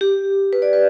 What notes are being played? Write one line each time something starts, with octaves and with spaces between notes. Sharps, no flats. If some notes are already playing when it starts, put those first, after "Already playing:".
G4
B4
D5
B4